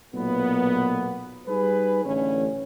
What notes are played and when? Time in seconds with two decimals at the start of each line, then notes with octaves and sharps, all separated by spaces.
0.14 B1 A#2 A#3 B3
1.47 G3 D#4 G#4 B4
2.05 A1 D3 C#4